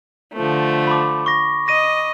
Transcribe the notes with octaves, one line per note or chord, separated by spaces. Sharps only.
D3 F3 A3
B5 D6
C#6 A#6
D#5 A#6 D#7